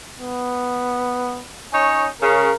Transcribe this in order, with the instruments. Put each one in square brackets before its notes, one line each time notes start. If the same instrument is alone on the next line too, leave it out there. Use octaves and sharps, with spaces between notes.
[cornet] B3
[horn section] C#4 D#4 C#5
[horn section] C#3 [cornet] A#4